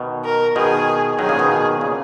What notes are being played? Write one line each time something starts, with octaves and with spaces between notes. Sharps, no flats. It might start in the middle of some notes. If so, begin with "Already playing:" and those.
Already playing: B2 D#3
A#4
B2 D#3 G#4
D#3 F#3 G#4
A#2 C#3
B2 D#3
A#2 C#3